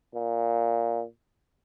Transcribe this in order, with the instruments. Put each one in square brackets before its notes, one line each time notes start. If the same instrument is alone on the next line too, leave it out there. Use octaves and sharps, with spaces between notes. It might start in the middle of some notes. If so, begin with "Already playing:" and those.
[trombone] A#2